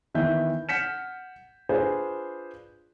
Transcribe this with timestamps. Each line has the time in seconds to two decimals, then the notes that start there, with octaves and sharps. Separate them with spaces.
0.14 D#3 E3 B3 E5 G6
0.69 F#5 F6 G6 B6 C#7 E7
1.69 D4 F4 G#4 B4 C5